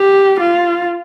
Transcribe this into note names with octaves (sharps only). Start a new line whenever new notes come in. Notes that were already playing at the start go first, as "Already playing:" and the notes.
Already playing: G4
F4